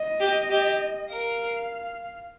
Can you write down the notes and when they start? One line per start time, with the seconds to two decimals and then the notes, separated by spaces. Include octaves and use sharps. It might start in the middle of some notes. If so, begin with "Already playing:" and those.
Already playing: D#5
0.20 G4
0.50 G4
1.10 A#4 F5